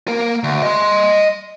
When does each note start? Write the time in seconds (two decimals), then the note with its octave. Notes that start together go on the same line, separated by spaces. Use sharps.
0.08 A#3 A#4
0.43 D2
0.63 D#5 C6